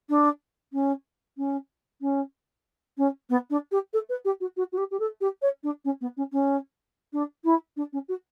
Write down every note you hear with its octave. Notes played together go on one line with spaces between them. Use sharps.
D4
C#4
C#4
C#4
C#4
B3
D4
G4
A4
B4
G4
F#4
F#4
F#4
G4
G4
A4
G4
C#5
D4
C#4
B3
C#4
C#4
D4
E4
D4
C#4
F#4